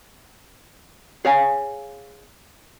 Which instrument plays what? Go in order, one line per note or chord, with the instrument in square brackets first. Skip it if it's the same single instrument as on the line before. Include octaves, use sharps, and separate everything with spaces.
[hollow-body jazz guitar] G#4 C#5 F5 G#5